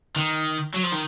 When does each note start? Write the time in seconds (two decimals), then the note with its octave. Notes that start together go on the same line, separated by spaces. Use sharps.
0.16 D#3
0.74 F#3
0.83 F3
0.92 D#3